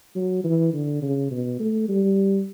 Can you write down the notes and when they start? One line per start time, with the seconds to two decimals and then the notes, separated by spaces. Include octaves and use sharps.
0.16 F#3
0.44 E3
0.73 D3
1.02 C#3
1.31 B2
1.60 A3
1.89 G3